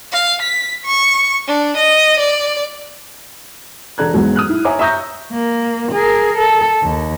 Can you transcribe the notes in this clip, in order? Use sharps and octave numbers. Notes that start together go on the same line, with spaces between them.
F5
B6
C#6
D4
D#5
D5
E1 A4 D5 A#5 F#6 G#6
E2 G#2 B2 F#3
D#6 F6 F#6
E4
C#5 E5 G#5 A#5 D6
E5 A#5 C#6 D#6 G6 A#6
A#3
G#4 A#4
A4
D#2